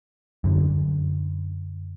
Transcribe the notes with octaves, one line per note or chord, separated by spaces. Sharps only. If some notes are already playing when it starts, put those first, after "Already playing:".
F#2 D3